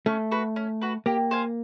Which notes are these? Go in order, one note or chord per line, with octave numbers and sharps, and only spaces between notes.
A3 C#4
F#4 B4
C#4
F#4 B4
A#3 G4
C5 F5 G#5